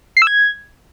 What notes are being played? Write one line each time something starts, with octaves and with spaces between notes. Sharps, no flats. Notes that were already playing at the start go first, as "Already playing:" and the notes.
C7
E6
G#6